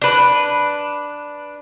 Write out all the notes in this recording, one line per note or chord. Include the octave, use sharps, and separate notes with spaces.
D4 B4